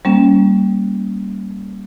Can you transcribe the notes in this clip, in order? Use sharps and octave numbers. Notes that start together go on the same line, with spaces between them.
G3 A#3 C#4